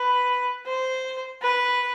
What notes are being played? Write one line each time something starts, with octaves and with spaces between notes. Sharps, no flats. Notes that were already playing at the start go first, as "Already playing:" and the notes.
Already playing: B4
C5
B4